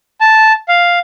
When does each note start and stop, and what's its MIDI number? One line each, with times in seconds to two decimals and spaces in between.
0.21 0.53 81
0.68 0.99 77